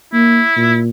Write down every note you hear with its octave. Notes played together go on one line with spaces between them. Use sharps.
A#3 E4
A#2